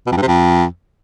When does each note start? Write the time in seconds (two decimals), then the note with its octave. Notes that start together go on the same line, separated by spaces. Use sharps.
0.07 B2
0.12 F2
0.17 G2
0.22 C3
0.28 F2